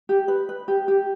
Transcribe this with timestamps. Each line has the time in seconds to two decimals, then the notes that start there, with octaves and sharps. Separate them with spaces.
0.09 G4
0.28 B4
0.49 B4
0.68 G4
0.88 G4